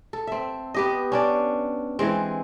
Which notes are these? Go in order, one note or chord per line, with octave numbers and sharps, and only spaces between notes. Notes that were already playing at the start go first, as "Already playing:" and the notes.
A4
C4 E5
B3 G4 D#5
C#4 D4 D5
E3 G#3 C4